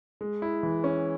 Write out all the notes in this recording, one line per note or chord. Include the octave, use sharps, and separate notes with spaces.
G#3
E4
E3
C#4